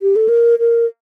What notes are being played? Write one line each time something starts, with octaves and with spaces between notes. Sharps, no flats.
G4
A4
A#4
A#4